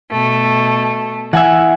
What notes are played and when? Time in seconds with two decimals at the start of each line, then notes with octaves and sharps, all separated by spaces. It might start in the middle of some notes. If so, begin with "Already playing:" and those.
0.11 B2 A3
1.33 E3 E5 F#5 G#5